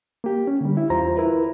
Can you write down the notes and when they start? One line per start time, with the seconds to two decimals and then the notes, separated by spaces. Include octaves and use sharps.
0.24 A#3 G4
0.47 C#4
0.61 D3 G3
0.77 E4
0.90 E2 F4 C5 A#5
1.17 E4 A#4 B4